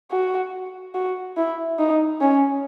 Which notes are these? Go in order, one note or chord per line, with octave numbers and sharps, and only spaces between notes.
F#4
F#4
E4
D#4
C#4